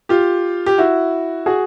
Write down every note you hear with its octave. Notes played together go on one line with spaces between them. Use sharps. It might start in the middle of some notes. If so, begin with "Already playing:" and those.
F4 G4
G4
E4 F#4
F#4 G#4